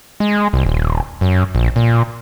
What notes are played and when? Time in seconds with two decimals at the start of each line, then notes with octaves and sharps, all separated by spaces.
0.20 G#3
0.53 C2
0.66 D#1
1.21 F#2
1.55 A#1
1.76 A#2